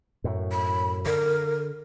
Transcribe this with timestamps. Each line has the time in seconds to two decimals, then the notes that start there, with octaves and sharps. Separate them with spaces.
0.24 F#2 A2
0.52 B5
1.06 D3 A#4